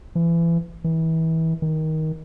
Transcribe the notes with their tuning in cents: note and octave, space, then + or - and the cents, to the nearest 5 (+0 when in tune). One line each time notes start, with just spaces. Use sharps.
E3 +30
E3 -30
D#3 +15